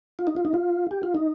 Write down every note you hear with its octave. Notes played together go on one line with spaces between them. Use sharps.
F4
D#4
F4
D#4
F4
G4
F4
D#4